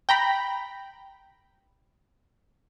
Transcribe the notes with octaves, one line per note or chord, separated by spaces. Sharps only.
G5 A#5 B5